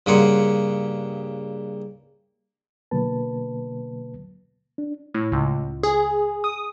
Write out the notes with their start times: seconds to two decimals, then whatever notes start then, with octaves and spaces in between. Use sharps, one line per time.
0.06 G2 C#3 A#3 G#4 F#5 C6
2.91 B2 D3 F#3 A#3 B4 A5
4.78 D4
5.14 A2
5.32 C#2
5.83 G#4
6.44 D#6